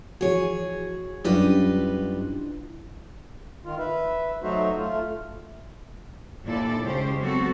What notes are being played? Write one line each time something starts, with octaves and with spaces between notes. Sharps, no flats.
E3 F3 F#4 G#4 C#5
F#2 G3 D4 E4 F4 B4 D#5
D#3 F4
B4 E5
F#3 A3 D#4 F#4 C5 E5
A3 F4
D#2 A#2 D4 E4 A4 D5
C#3 G#3 C#4 G4 C5
F#3 B3 C4 F#4 A4